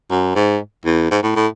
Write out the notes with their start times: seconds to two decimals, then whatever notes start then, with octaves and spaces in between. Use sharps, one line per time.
0.11 F#2
0.36 G#2
0.85 E2
1.11 G#2
1.23 A2
1.36 A2